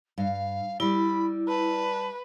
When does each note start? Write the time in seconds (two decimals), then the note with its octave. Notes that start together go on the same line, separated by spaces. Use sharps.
0.18 G2 F5
0.80 G3 E4 D5 B5
1.48 B4 A5